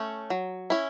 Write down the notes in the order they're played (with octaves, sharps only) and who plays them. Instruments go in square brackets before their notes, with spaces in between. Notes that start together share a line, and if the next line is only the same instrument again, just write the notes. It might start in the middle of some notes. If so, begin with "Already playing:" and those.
Already playing: [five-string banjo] A3 C#4
F#3
C#4 E4